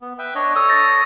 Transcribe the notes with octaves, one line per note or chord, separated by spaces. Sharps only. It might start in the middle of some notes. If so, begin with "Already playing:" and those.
B3
B4 E5 G5
D4 C#5 D#5
A4 C#5 D#6 E6
G6 A6 A#6